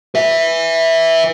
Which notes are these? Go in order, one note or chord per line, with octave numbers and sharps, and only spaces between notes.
B4 E5